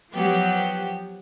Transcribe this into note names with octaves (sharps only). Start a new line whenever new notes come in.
F3 F#3 B3 G4